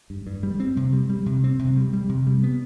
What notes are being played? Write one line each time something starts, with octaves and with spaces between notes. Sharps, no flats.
G2
G2
G3
C4
C3
G3
G3
C3
C4
C3
G3
G3
C3
G3
B3